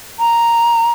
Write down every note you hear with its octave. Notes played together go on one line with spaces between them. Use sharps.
A#5